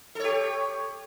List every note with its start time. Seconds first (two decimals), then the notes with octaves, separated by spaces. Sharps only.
0.15 A4
0.20 C#5
0.24 G4